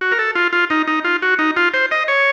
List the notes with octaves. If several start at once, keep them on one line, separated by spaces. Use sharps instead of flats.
F#4
A#4
A4
F4
F4
D#4
D#4
F4
F#4
D#4
F4
C5
D#5
C#5